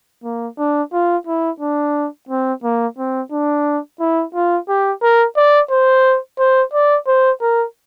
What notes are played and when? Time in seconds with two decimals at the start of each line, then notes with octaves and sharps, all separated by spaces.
0.24 A#3
0.58 D4
0.93 F4
1.27 E4
1.60 D4
2.29 C4
2.63 A#3
2.98 C4
3.31 D4
4.00 E4
4.35 F4
4.69 G4
5.02 A#4
5.37 D5
5.71 C5
6.39 C5
6.73 D5
7.07 C5
7.42 A#4